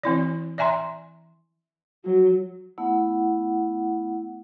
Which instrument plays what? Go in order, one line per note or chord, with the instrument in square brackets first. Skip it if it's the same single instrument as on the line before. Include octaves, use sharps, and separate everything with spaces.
[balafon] E3 C4 E4 D5
D5 E5 G#5 A#5 C6
[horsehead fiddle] F#3
[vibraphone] A3 B3 E4 F#5